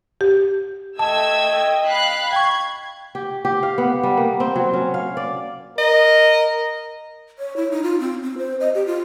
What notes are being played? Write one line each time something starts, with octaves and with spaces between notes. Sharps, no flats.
G4
A3 D#5 G5 A5 E6 G#6
F5 B5 F#6
G5 C#6 G#6
G4
G4
F5
B3
G3
A#3
C4
F#3
C#4
F5
D5
A#4 D#5
C#5
E4
D#4
F4
C4
C4
C5
D#5
G4
F4